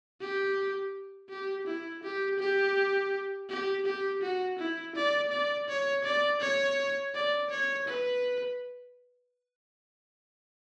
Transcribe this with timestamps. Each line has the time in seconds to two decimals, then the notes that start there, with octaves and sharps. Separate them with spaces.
0.21 G4
1.30 G4
1.67 E4
2.03 G4
2.39 G4
3.50 G4
3.86 G4
4.21 F#4
4.59 E4
4.95 D5
5.32 D5
5.69 C#5
6.04 D5
6.41 C#5
7.14 D5
7.50 C#5
7.88 B4